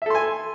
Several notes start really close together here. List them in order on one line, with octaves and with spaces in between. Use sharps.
E5 A4 C6 G#5